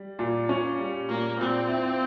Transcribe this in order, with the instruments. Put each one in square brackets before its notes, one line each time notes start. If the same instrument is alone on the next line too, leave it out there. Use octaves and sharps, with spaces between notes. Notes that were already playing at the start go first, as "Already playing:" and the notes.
Already playing: [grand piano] G3
A#2
C#4
G3
[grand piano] A#2 [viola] A#3
[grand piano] A#2 [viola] C4
[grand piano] E4